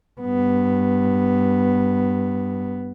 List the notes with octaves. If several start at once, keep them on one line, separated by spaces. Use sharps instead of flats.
G2 B3